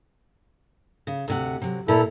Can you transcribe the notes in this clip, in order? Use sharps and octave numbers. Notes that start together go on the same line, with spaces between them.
C#3
D2 C3 F#5
C3 F#3
A#2 E4 A4 A#5